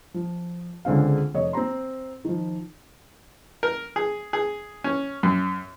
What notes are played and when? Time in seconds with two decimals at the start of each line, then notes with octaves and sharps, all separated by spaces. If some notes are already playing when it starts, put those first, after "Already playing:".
0.14 F3
0.85 C#2 D3 G#3 C4 F5
1.34 F1 C#5 D#5
1.53 C4 C5 A#5 C6
2.25 D#3 F3
3.63 A#4
3.96 G#4
4.33 G#4
4.84 C#4
5.23 F#2